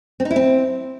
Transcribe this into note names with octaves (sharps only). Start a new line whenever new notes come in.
C4
D#4
E4
C4